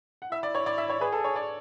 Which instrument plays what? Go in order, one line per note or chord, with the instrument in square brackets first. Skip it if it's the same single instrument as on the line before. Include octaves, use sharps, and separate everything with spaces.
[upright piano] F#5
[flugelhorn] E4 [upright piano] E5
[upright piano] D5
C#5
D5
E5
C#5
[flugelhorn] G#4 [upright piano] B4
[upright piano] A4
C#5
D5